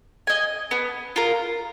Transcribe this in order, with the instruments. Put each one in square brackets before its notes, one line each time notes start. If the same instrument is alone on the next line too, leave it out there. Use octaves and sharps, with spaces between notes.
[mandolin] D#5 G#5
B3
F4 A#4